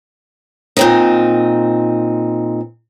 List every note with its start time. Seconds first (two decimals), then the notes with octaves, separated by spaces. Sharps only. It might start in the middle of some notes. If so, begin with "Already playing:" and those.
0.77 A#2 C4 D#4